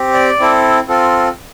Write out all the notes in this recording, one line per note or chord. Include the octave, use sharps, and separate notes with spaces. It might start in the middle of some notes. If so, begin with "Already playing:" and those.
Already playing: C4 G4
D5
C4 E4 A4
C4 F4 A4